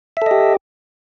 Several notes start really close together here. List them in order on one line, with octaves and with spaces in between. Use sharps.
E5 A4 D#5 G4